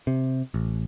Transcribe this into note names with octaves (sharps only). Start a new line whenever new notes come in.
C3
A1